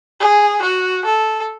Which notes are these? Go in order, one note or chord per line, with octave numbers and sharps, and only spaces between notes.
G#4
F#4
A4